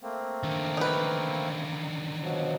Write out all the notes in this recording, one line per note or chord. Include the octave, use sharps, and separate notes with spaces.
A3 A#3 C4
D3 D#3
D#4 B4
B2 F3 F#3